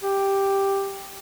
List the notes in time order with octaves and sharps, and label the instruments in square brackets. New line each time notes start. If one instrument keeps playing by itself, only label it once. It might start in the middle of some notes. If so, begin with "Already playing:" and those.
[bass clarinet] G4